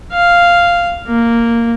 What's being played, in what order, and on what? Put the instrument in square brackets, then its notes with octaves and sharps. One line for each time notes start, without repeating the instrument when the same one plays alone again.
[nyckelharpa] F5
A#3